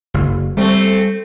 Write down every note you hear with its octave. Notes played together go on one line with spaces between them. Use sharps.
F#1
G3 A3 C4